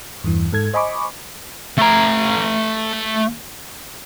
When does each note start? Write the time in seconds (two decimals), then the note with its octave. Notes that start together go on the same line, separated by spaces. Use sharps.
0.24 E2 G2 E3
0.53 G#2 A4 G#6
0.74 C5 D#5 G#5 B5 C#6 D6
1.78 A3 A#5